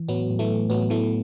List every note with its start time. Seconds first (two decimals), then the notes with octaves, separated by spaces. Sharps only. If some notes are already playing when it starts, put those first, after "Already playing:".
Already playing: E3
0.09 A2 F#3 B3
0.30 A2
0.39 E3 A3
0.50 A2
0.70 A2 F#3 B3
0.90 E3 A3 B3